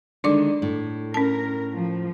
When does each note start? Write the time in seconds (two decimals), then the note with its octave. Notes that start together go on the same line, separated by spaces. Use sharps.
0.24 D3 D#3 G#3 D4 D5 D6
0.62 A2
1.14 C#4 A#4 A5
1.75 F3